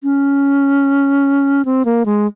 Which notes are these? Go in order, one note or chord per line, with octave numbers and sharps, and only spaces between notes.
C#4
C4
A#3
G#3